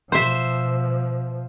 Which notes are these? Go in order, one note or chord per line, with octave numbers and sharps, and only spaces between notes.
B2 F3 C5 E5